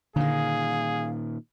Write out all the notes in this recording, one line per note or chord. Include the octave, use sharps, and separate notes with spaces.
A#2 D3 D#3 G#4 F5